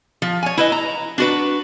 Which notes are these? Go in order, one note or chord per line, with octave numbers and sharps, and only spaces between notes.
F3
C#5 G#5
E4 B4 D#5
A#5
D4 F#4 B4